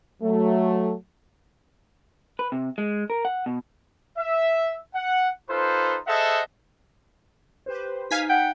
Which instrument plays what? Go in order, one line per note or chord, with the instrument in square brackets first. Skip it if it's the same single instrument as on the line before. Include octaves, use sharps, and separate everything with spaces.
[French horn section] F#3 A3
[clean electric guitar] B4
C3
G#3
A#4
F#5
B2
[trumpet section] E5
F#5
D#4 F4 A4 B4 C5
G#4 A4 C5 D#5 E5 F#5
[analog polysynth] G4 B4 C5
[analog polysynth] D#4 [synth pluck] F5 G#5 B6
[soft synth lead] F#5 [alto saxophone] G5